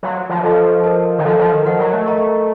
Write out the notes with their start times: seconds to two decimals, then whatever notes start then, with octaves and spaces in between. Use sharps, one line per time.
0.03 F#3 C#5 F5 C6
0.29 F3
0.43 F3 F4 A4 D#5 A5 C#6
0.84 A#4 D#5 A5
1.18 D#3
1.25 F3 A4 D#5 F#5
1.39 F3
1.52 D#3
1.65 F3 A#4 D#5 F#5
1.79 F#3
1.93 A3
2.06 A#4 D#5 A#5 C#6